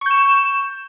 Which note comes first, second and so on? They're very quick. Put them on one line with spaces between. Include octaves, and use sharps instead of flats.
C#6 G6 E7